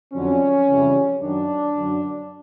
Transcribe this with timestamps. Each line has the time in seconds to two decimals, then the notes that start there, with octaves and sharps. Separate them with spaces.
0.14 F2 D3 F#3 C#4
0.68 F2 C#3 E3 G3
1.21 F#2 D#3 F#3 D4
1.76 F#2 D3 F#3